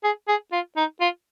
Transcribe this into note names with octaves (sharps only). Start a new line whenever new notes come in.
G#4
G#4
F4
D#4
F4